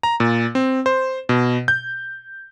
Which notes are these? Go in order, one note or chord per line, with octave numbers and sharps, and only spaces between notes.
A#5
A#2
C4
C5
B2
G6